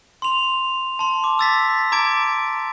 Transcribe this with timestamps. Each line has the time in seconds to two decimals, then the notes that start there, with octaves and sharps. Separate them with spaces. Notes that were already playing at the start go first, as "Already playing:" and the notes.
0.22 C6 F7
0.99 A5 C6
1.24 D6
1.39 E6 A6 B6
1.92 A#5 D6 G#6 D7